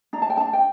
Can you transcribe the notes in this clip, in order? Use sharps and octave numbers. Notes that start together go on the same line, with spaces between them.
D4 A#5
A5
G5
A5
D4
G5